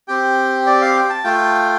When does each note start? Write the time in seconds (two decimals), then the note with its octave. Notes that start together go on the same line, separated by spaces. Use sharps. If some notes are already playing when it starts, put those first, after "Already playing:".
0.08 C4 G4 G5
0.67 D5
0.81 F5
0.96 G5
1.09 A5
1.24 A3 F4 G5